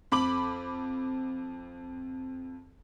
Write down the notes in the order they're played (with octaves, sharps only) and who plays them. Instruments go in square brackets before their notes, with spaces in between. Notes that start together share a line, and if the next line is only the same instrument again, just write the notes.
[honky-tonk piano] F2 B5 D6 F#7